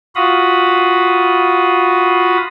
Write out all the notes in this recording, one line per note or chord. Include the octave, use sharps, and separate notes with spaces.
F4 F#4 F5 B5 D#6